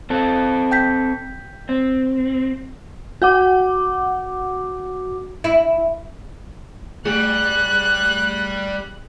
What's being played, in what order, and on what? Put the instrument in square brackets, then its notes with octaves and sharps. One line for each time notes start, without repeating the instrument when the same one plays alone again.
[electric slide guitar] C4 A4
[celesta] G5 G6 B6
[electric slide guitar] C4
[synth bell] F#4 F#5 D6
[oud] E4
[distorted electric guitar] G3 [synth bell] A3 G#4 [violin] F#6